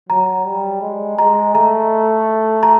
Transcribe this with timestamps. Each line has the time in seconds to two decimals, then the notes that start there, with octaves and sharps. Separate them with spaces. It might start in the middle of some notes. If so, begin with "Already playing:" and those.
0.09 F#3 A#5
0.45 G3
0.82 G#3
1.18 G#3 A#5
1.54 A3 A#5
2.63 A#5